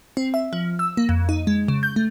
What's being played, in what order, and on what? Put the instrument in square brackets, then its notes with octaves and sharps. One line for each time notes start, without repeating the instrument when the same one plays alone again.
[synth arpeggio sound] C4
E5
F3
E6
A#3
F2
D#4
G#3
C#3
G6
A3